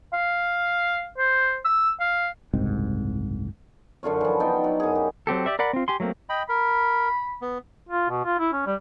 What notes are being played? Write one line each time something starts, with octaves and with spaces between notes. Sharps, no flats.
F5
C5
E6
F5
F#1 C2 G#2 C4
F#2 D3 F4 C#5
E3 F3
B3 D#4 F4 G5
F#3
F#2 G#4
G4
F#3 C4 G4 A4
G4 D5 E5
A#4 D5 F#5 B5
C4 F4
G4 G#5 C6
F#3 A3 A#3 C4
D#5 G5 B5
A#4 B5
B3
F4
B2
F4
E4
C#4
G3